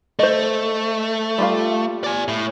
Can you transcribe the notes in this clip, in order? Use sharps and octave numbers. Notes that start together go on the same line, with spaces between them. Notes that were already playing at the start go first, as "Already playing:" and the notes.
A3 C5 D#5
G3 F4 F5
D5 G#5
A2